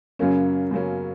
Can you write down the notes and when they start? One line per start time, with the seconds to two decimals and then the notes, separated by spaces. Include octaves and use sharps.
0.19 F#2 C#3 F#3 A#3 C#4
0.71 F#2 C#3 F#3 A#3 C#4